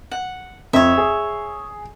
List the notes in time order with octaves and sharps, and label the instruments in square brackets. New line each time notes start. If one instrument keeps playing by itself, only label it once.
[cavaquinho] F#5
[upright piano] F2 [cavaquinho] C#5 E5
[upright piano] G#4